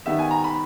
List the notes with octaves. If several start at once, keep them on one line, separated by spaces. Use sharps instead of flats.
D#3 G3 B3 E5
G#5
A#5
B5